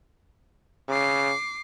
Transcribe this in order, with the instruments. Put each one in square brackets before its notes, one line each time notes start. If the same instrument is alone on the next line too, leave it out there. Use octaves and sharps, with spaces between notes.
[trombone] C#3 [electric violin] D6 C7